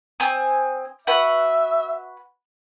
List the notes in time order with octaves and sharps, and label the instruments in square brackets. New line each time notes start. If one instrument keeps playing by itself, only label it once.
[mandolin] C4 G#5 D#6
[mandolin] F#4 B4 F#5 [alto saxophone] E5